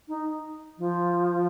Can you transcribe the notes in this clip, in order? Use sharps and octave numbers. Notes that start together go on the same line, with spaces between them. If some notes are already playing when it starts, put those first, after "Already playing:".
D#4
F3